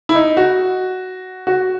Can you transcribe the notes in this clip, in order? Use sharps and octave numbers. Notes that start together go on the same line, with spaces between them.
E4
D#4
F#4
F#4